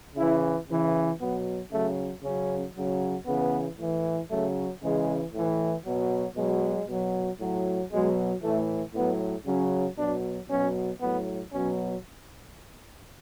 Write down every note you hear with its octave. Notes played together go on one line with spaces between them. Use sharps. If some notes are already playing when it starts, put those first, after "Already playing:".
C#3 E3 E4
C#3 E3
B2 F#3 B3
C#3 F#3 A3
C#3 F#3 C#4
C#3 F#3
C#3 E3 B3
A2 E3
C#3 F#3 A3
C#3 E3 G#3
A2 E3
B2 F#3
B2 F#3 G#3
B2 F#3
A2 F#3
B2 F#3 G#3
A2 E3 A3
A2 F#3 B3
C#3 F#3 C#4
B2 F#3 D4
B2 F#3 C#4
A2 F#3 B3
B2 F#3 C#4